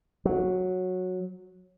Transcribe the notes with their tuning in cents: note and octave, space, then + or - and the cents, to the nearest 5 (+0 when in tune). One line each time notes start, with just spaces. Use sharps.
F#3 -10